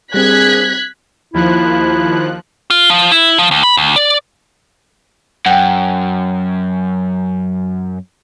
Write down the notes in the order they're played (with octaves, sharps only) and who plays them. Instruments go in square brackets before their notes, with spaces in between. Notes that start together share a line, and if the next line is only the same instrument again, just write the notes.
[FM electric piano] G3 C4 [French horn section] A#3 D4 G#4 [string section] F#6 G#6 B6
[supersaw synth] D#2 F3 F#6 [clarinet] E4
[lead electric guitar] F4
F3
E4
F3
D2
B5
D2
D5
[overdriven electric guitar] F#2 [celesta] F#5 G5